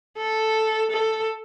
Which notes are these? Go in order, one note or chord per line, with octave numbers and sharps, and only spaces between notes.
A4
A4